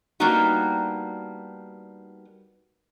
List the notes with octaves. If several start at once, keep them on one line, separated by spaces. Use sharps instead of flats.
G3 A#3 B3 D4 D#4 F#4